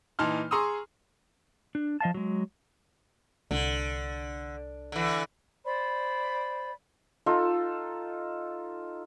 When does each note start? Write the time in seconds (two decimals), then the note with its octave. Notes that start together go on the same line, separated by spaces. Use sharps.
0.19 A#2 E3 D#4 A5 C6 F6
0.51 G#4 A#5 C6 C#6 D#6 E6
1.75 D4
2.00 F3 D#5 F5 A5
2.14 F#3 G#3
3.51 C2 D3
4.92 D3 E3
5.63 C5 D5 B5
7.26 D#4 F4 A4